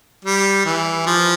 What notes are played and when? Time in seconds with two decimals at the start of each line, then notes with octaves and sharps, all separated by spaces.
0.25 G3
0.66 E3
1.06 F3